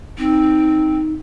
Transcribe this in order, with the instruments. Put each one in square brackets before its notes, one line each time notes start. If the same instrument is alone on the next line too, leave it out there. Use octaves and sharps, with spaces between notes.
[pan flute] C4 [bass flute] D#4